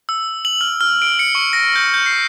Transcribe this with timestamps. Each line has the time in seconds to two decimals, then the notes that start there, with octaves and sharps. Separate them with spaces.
0.09 E6
0.45 F#7
0.61 F6
0.81 F6
1.02 D7
1.19 C#7
1.35 C#6
1.53 A#6
1.76 G6
1.94 G6
2.06 C7